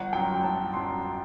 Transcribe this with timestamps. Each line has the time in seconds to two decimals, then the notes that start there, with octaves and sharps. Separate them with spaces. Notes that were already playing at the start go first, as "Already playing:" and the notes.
Already playing: G1 F#5
0.13 F#2 F#3 G5
0.43 G1 A5
0.74 F#2 F#3 C6